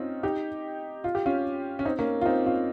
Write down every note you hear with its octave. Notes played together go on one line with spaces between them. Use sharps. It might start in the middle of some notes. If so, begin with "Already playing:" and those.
Already playing: C4 C#4 D#4 F4
D#4 G4
F4
G4
C#4 F4
C#4
C4 D#4
A#3 C#4
F4
C4 D#4
C#4 F4